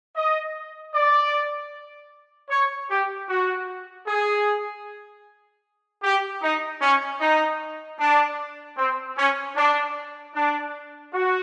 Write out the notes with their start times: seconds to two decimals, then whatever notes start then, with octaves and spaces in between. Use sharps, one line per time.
0.15 D#5
0.94 D5
2.50 C#5
2.89 G4
3.29 F#4
4.07 G#4
6.03 G4
6.42 D#4
6.81 C#4
7.21 D#4
7.99 D4
8.77 C4
9.17 C#4
9.56 D4
10.34 D4
11.12 F#4